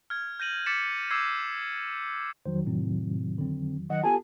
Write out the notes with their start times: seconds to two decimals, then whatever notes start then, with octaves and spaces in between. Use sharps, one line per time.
0.10 F6 G#6
0.40 G6 A#6 D#7 F#7
0.66 D6 A6 B6 C#7 E7
1.10 D6 E6 G6 G#6 C7
2.46 F2 D#3 F#3 C5
2.66 A2 C3 C4
3.38 D3 C4
3.90 D#3 F#3 D#5 F#5
4.04 B3 F4 G4 A4 G#5 A5